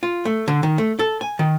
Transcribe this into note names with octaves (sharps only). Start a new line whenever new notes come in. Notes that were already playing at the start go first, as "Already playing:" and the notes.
F4
A3
D3
D#3
A3
A4
G#5
D#3